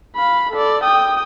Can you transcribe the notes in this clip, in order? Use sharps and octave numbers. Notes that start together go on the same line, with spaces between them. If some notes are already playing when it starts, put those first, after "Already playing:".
F5 B5
A4 D5
G5 D#6